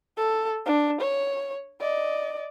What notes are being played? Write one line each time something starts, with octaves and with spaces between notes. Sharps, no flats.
A4
D4
C#5
D5 D#5